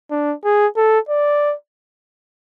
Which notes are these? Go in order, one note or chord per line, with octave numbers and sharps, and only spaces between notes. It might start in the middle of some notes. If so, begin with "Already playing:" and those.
D4
G#4
A4
D5